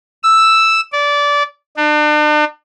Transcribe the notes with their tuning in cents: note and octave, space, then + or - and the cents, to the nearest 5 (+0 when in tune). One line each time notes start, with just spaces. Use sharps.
E6 +0
D5 -20
D4 +40